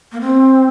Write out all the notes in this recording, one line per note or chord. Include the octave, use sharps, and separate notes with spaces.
A#3
C4